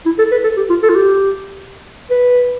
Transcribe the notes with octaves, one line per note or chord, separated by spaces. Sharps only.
E4
A4
B4
A4
G4
F4
A4
F4
G4
B4